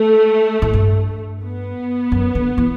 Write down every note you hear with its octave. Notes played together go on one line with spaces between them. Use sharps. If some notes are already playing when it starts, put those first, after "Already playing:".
Already playing: A3
A2
G2
B3
F#2
D3
E3